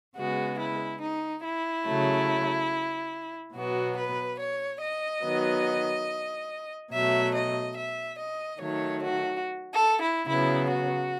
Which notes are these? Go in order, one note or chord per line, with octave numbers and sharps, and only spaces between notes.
C#3 G#3 B3 F#4
E4
D#4
E4
C#3 F#3 A3
B2 F#3 B3 F#4
B4
C#5
D#5
D#3 F#3 B3
B2 F#3 A3 E5
D#5
E5
D#5
D#3 F#3 A3 C#5
F#4
A4
E4
C#3 F#3 B3 E4
F#4